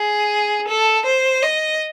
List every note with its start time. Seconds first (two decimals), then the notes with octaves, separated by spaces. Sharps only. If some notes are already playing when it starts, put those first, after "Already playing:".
Already playing: G#4
0.68 A4
1.06 C5
1.43 D#5